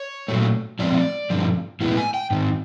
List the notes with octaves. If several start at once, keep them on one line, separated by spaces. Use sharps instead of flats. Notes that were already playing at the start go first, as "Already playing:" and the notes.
Already playing: C#5
A#2 F#3 A3
A2 F3 G#3 C4 D5
G2 D3 F3
A2 E3 G#3 B3
G#5
G5
G#2 D#3